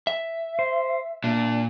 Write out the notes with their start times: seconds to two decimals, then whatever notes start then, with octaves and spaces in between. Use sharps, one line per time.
0.07 E5
0.59 C5
1.24 A#2 D4